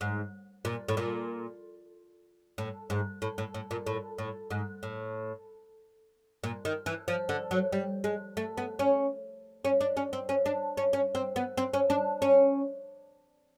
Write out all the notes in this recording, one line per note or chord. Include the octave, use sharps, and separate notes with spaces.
G#2
A#2
A2
A#2
A2
G#2
A2
A2
A2
A#2
A2
A2
G#2
A2
A#2
D#3
E3
F3
D3
F#3
G3
G#3
A3
B3
C#4
C#4
D4
C#4
C4
C#4
D4
C#4
C#4
C4
B3
C4
C#4
D4
C#4